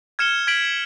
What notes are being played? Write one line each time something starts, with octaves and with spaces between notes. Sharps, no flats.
F6 G#6 C#7 E7 G7
G#6 B6 D7 F#7